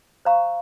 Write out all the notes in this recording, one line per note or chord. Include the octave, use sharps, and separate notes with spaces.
C5 F5 A#5 C#6